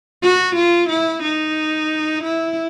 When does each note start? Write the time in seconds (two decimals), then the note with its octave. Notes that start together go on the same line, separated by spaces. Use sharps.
0.23 F#4
0.55 F4
0.89 E4
1.23 D#4
2.23 E4